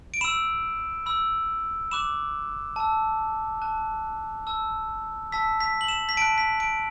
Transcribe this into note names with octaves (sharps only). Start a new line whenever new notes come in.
D7
B5 E6 E7
B5 E6
B5 D6 F#6 E7
A5 E6
A5 F#6
A5 E6
A5 E6 B6
B6
F#7
E7
B6
A5 F#6 D7
B6
D7